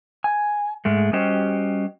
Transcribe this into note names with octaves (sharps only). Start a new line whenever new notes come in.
G#5
G#2 G#3 A3
G3 C#4 F#4 G4 C5 D#5